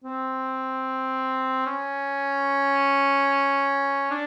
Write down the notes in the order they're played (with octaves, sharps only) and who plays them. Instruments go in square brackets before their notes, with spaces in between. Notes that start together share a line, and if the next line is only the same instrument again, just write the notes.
[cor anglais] C4
C#4
D4